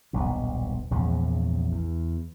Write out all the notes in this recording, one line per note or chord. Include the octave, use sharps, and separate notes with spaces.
D#1 B1 G2
A#1 E2 G#2 C#3
E2